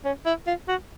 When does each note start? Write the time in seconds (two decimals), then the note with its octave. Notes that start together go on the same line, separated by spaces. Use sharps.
0.05 C#4
0.26 E4
0.47 F4
0.68 F#4